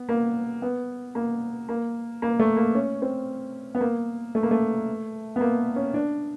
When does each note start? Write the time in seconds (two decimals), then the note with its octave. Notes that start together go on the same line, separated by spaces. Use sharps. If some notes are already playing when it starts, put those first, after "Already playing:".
Already playing: B3
0.09 A#3
0.62 B3
1.15 A#3
1.69 A#3
2.22 A#3
2.39 A3
2.57 A#3
2.75 C#4
3.02 C4
3.75 B3
3.81 A#3
4.35 A3
4.43 A#3
4.51 A3
5.36 B3
5.41 A#3
5.76 C#4
5.94 D4